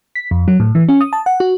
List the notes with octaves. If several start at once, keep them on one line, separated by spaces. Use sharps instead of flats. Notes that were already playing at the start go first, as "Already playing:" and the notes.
B6
F2
F#3
A2
E3
C#4
D#6
A5
F#5
F#4